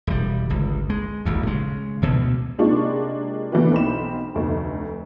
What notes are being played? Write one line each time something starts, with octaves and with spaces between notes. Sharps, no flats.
E1 G3
G1 C#2
G#3
D#1 G#1 D2
C#3 G#3
D2 B2
C3 G#3 A#3 D4 F4 C#6
E3 A3 B3 D4 F#4 B4
B1 C4 B5 E7
F1 D2